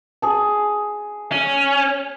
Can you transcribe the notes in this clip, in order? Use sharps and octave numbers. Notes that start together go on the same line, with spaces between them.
G#4 A5
C#4